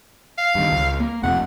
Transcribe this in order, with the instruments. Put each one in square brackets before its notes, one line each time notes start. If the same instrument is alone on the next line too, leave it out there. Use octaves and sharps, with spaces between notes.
[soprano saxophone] F5
[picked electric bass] G2 D#3
C#2
A#3
[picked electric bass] F1 F2 C3 [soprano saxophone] F#5